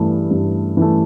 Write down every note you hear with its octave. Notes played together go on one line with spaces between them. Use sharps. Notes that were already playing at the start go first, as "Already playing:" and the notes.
Already playing: G2 E3 A3
G2
E3 A3